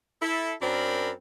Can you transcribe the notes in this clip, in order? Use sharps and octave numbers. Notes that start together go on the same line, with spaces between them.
E4 A4
F#2 C4 D4 A#4 B5